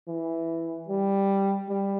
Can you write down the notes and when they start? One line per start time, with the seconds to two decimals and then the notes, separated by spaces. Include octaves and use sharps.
0.08 E3
0.88 G3
1.69 G3